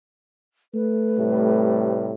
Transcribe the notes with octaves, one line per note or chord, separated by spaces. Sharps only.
A3 B4
A2 C3 G3